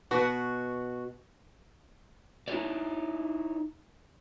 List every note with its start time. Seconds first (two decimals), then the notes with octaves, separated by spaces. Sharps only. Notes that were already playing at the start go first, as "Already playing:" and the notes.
0.11 B2 F#4
2.48 D#4 E4 F#4 A4 C#5 D5